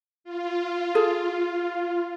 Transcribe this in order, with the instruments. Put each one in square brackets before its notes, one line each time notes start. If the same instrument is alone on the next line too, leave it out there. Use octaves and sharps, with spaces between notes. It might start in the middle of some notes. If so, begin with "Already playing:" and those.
[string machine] F4
[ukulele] G#4 A4